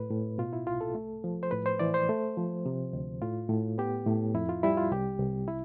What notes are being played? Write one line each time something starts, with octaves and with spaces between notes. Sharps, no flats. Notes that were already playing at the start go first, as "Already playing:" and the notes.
Already playing: A2 B4
A2
B2 F4
E4
C2 F4
A4
A3
F3
C5
A2 B4
C5
E3 D5
C5
A3
F3
C3
D2
A2 F4
A2
B3 G4
A2
F2 E4
F4
G3 E4
F4
C2 G4
C2
E4